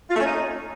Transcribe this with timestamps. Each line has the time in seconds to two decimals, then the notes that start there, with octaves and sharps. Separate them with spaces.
0.09 F4
0.14 A3
0.20 C#4
0.25 D#4